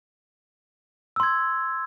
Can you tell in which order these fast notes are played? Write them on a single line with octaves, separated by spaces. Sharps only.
E6 C6 G#6